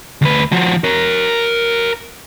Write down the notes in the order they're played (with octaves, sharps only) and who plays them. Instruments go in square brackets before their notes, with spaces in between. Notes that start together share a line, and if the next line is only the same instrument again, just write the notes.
[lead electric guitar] D2 B4
F3 F#4
A#4 C#5